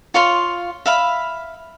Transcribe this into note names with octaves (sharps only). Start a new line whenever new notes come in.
F4 C#5 F5 C6
E5 F5 B5